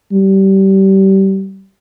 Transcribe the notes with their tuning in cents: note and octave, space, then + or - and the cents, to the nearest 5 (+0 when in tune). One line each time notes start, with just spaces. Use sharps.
G3 -25